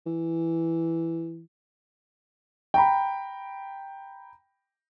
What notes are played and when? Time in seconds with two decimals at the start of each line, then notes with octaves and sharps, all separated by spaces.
0.06 E3
2.74 G5 A#5 B5